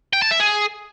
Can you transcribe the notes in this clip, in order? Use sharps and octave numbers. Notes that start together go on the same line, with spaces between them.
G5
A5
E5
G#4